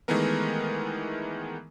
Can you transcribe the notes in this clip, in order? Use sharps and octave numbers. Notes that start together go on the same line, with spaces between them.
D#3 E3 G#3 A3 B3 A#4